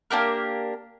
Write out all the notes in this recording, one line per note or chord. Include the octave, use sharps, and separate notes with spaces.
A#3 D4 G4 A#4